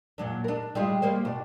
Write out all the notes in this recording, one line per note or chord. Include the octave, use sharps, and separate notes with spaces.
A#2 F#3 D4
D4 A#4
G3 G#3 F4
G3 A#3 C5
B2 D4